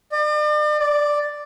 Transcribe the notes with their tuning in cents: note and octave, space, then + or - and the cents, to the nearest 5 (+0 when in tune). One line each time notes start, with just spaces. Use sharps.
D5 +40
D5 +0